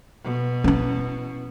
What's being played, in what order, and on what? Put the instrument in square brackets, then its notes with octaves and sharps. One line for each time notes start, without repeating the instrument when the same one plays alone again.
[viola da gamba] B2
[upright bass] C#4 E4